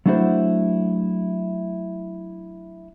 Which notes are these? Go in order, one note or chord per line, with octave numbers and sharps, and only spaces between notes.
F#3 A3 D4 E4 F#4 C5